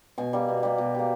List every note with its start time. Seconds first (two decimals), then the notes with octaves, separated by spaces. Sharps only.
0.18 B2 G#5
0.33 G3 A#3
0.48 B2
0.63 G3 A#3
0.78 B2
0.95 G3 A#3